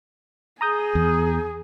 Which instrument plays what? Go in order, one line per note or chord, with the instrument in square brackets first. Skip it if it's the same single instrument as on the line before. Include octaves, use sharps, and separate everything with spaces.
[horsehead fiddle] G#4 [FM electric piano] A#5 D#6 G6
[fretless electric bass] E2